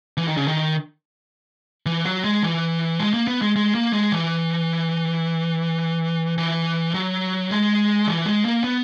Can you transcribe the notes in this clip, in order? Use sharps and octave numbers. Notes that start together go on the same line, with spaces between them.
E3
D#3
C#3
D#3
E3
F#3
G#3
E3
G#3
A#3
B3
G#3
G#3
A#3
G#3
E3
E3
F#3
G#3
E3
G#3
A#3
B3